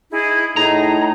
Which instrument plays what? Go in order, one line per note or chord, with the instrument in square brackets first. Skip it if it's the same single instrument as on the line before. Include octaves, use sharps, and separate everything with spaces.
[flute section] D#4 E4 G#4
[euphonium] A2 [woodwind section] D#4 [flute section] G#4 [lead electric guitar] A#5